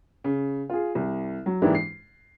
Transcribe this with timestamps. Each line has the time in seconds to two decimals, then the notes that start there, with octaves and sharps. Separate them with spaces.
0.24 C#3
0.70 F4 G#4
0.95 C2
1.46 F#3
1.62 G#2 E3 A#3 D4 E4 G4
1.75 C7